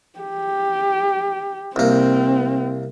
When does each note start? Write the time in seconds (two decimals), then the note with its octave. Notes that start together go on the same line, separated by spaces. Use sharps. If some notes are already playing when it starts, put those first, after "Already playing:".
0.19 G4
1.76 C2 A#3 C4